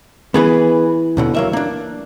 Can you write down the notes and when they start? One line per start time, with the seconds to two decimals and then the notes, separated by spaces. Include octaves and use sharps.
0.34 E3 B3 G#4 B4
1.17 D#2 B2 D3
1.35 F#3 A#3 E5
1.53 A#3 D4